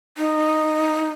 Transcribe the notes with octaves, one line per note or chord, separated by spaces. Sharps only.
D#4